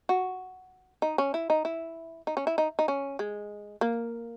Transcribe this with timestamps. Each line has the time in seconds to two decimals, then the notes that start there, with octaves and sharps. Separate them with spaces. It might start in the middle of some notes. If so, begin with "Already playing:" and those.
0.09 F#4
1.02 D#4
1.18 C#4
1.34 E4
1.50 D#4
1.65 E4
2.27 D#4
2.37 C#4
2.47 E4
2.58 D#4
2.79 D#4
2.88 C#4
3.19 G#3
3.81 A#3